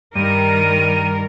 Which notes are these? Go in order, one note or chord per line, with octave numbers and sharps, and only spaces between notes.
G2 D#3 G3 A#4 D#7